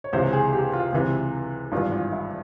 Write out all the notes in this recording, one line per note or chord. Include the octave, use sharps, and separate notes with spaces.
C#5
C#2 C3 E3 C5
G#4
G4
F4
C#2 C3 E3
G#1 G2 E3 F4
F4
E4